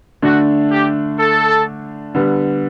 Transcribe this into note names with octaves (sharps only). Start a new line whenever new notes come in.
D3 A3 D4 F#4
G4
A4
D3 G3 B3